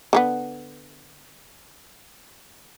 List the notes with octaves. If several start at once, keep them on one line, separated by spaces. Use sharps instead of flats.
D3 G3 B3